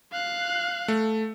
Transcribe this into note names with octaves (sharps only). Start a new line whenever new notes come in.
F5 F#6
A3